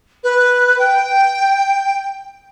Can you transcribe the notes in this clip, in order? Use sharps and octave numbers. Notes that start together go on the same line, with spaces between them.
B4
G5